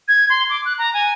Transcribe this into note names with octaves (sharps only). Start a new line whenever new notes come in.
G#6
C6
D6
F#6
A#5
G#5